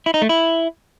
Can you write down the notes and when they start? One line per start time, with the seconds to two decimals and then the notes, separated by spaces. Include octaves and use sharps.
0.06 E4
0.14 D#4
0.22 A3
0.29 E4